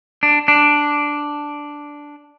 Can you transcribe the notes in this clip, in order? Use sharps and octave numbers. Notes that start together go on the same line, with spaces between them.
D4
D4